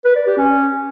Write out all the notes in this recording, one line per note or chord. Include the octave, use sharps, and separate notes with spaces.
B4
D5
G4
C#4